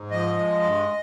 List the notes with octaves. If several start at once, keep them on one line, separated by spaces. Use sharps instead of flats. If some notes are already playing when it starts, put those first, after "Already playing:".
Already playing: G#2
F3 D#5
G#3
G2